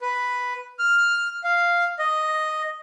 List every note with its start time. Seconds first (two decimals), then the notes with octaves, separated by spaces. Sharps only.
0.01 B4
0.79 F6
1.44 F5
1.99 D#5